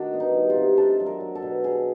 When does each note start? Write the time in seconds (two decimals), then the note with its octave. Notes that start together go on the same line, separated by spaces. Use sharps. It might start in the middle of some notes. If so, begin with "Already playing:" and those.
Already playing: D#3 D4 F#4
0.13 B3
0.20 D#4
0.35 G3
0.50 F4
0.56 C3
0.78 D4 A4
1.00 F#3
1.06 A#4
1.20 F#3
1.35 A4
1.42 B2
1.64 F#3 G#4